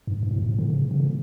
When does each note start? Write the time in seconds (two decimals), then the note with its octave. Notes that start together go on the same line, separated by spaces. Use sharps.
0.07 G2
0.23 G2
0.31 A2
0.38 G#2
0.49 A2
0.59 D3
0.70 C#3
0.91 C#3
1.00 D3